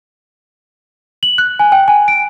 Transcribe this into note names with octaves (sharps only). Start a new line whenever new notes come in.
F#7
F#6
G#5
G5
G#5
D7